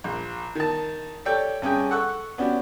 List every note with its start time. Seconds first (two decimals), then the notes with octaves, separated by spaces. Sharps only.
0.04 A#1
0.55 D#3 A5
1.25 G4 A4 C#5 D5 G5
1.62 G2 C#4 G#4 G5
1.90 A4 F#5 C#6 E6 F#6
2.38 B3 C#4 D4 F#4 G4